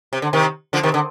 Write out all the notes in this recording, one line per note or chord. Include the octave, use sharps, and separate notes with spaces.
C3
D3
C3 D#3
D3 F3
C3 D#3
D3